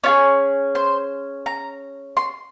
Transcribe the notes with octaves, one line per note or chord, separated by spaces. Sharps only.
C#4 F4 G#4 C#5
C5
A#5
C6